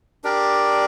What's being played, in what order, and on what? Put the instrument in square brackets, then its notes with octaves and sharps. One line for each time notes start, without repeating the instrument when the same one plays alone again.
[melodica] D4 G4 A#4 D5